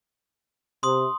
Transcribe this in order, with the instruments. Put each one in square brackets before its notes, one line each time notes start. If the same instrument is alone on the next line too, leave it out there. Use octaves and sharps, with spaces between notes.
[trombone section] C3 [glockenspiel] C6 D#6